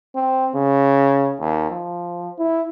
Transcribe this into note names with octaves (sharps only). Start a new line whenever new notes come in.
C4
C#3
D#2
F3
E4